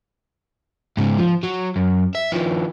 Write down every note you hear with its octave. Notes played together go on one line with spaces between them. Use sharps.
G#2 C#3
F3
F#3
F#2
E5
D#3 F3